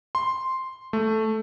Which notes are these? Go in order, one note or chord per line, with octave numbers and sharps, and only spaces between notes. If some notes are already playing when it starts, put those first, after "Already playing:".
C6
A3